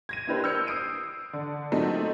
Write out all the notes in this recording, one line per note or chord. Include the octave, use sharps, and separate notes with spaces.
G#6 A#6 D#7
A#3 D4 E4 G4 B4 C5
E6 F6 G6 C#7
D#6 C7 D7 D#7
D3
A#2 F#3 A3 C4 D#4